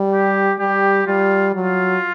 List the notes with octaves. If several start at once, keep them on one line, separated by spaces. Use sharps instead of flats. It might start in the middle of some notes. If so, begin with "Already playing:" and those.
Already playing: G3
G4
G3 G4
G3 F4
F#3 F4